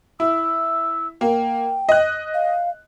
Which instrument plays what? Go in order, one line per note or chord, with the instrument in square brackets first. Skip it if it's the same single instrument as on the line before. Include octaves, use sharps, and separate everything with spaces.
[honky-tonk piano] E4 [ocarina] E6
[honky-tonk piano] A#3 [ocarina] G5
[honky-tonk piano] D#5 F#6
[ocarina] F5